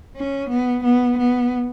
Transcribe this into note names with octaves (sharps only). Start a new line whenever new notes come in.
C#4
B3
B3
B3